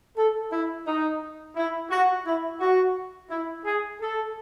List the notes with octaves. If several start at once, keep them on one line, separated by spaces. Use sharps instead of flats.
A4
E4
D#4
E4
F#4
E4
F#4
E4
G#4
A4